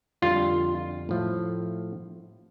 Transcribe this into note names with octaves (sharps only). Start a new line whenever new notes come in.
F2 D3 G3 F4
A2 F3 A3